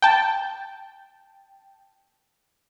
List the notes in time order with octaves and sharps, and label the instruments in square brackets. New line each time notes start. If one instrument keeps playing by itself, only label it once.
[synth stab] G5 A5